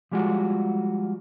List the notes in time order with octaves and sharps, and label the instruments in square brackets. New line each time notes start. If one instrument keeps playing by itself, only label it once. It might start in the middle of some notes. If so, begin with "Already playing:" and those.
[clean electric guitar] F3 G3 G#3 F4 F#4